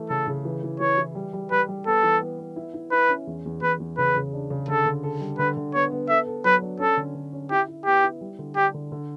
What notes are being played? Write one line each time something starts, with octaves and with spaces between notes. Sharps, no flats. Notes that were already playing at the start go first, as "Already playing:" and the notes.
Already playing: E3 A3
C#3 A4
C#3
E3
E3
E3 C#5
E3
G3
G3
G3 B4
G3
B3 A4
E3
B3
B3
E4
E4
E4 B4
C#4
E2
E2
E2 B4
E2
C#3 B4
C#3
D4
C#3
D3 A4
D3
A4
G3
D3 B4
D3
B3 C#5
B3
A4 E5
A4
F#3 B4
D4
C#4 A4
D3
D3
C#4
E4 G4
E4
B3 G4
E4
G3
D3
D4 G4
D3
D3